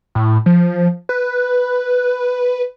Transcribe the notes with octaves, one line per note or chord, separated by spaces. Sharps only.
A2
F3
B4